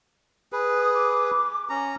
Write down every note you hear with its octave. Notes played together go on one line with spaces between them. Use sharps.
G#4 B4
D#6
D6
C#4 A#5